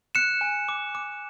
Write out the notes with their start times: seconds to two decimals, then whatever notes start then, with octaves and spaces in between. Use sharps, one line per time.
0.15 F#6 C#7 E7
0.41 G#5
0.69 D6
0.95 D6